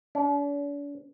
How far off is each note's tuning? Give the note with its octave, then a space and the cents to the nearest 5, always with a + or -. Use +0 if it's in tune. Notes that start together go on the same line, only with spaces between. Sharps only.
D4 -45